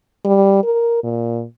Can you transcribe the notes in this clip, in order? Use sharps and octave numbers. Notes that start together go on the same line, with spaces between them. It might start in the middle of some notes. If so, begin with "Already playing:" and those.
G3
A#4
A#2